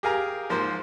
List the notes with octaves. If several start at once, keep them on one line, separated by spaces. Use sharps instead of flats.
G4 G#4 A#4 F5 G#5 A#5
G#2 F3 A#3 C5